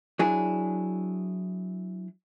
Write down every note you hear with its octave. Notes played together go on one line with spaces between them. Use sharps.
F#3 D4 E4 G#4